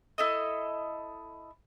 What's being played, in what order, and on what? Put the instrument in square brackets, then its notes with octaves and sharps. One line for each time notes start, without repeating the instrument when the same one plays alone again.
[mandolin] E4 A4 D#5